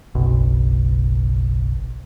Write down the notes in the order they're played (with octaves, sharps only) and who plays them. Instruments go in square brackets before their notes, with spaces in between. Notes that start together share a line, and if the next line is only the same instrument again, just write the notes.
[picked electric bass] F#1 B1